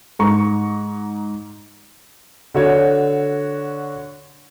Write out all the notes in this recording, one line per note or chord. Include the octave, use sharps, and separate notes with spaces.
G#2 A#5 C#6
D3 F#4 C#5